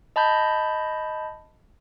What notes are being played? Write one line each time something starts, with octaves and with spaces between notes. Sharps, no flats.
D#5 A5 B5 G6